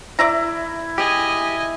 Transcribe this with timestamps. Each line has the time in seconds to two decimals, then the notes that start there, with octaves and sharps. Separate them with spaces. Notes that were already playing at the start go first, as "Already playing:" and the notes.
0.19 E4 D5 E5 A#5
0.98 G4 G#4 D#5 G#5